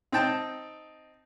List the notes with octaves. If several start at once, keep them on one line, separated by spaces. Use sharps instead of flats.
C4 D#4 G5 A5